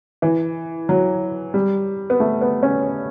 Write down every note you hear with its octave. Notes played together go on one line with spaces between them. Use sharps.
E3
F#3
G3
B3
A3
B3
C#4